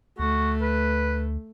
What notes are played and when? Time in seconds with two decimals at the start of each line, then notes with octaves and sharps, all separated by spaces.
0.19 D2 A3 F#4
0.62 B4